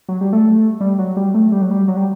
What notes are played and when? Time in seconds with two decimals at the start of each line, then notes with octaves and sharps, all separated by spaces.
0.09 F#3
0.21 G3
0.33 A3
0.81 G3
0.99 F#3
1.17 G3
1.34 A3
1.52 G3
1.62 F#3
1.71 G3
1.88 F#3
1.96 G3